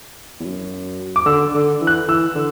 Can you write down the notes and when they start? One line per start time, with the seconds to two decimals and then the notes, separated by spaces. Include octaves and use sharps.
0.40 E2
0.45 F#2
1.16 D6
1.26 D3 E6
1.54 D3
1.81 E3
1.87 F#6
2.08 E3 E6
2.35 D3